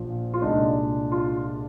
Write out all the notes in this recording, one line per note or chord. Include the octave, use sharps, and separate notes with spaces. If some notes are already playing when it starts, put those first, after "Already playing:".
Already playing: A#1 A#2 F3
F4
C2 A#2 G#3 D4 D#4
F4